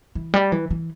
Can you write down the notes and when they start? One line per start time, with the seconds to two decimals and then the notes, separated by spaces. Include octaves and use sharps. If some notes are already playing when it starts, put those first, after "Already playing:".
0.15 E3
0.34 G3
0.52 E3
0.70 E3